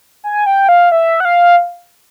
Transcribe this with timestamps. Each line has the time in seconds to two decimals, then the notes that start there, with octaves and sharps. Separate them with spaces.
0.24 G#5
0.46 G5
0.69 F5
0.92 E5
1.20 F#5
1.25 F5